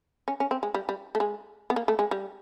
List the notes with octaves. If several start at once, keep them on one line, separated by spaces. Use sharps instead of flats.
C#4
C#4
C4
G#3
G3
G3
A3
G#3
B3
A#3
A3
G#3
G3